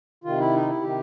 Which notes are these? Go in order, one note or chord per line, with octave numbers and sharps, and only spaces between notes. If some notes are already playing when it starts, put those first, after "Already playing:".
C3 D#3 F4
E4
D#4
E4
C3 D#3 G4